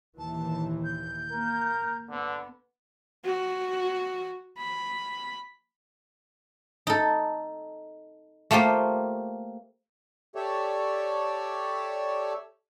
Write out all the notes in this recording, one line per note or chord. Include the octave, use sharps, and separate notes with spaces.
D#2 A#2 E3 A5
G6
A#3 A#4
D3 B3
F#4
B5
D#4 A4
A3 A#3 F4 G4 C5
G4 A4 C#5 D5 E5